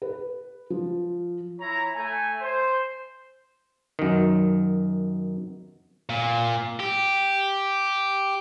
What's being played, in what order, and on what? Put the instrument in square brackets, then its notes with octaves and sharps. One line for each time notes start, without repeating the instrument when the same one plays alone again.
[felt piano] B4
F3
[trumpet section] E4 C#5 A#5
A3 G#5
C5
[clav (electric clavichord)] F#2 D#3
[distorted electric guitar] A#2
G4